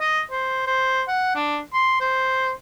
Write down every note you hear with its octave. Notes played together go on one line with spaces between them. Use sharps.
D#5
C5
C5
F#5
D4
C6
C5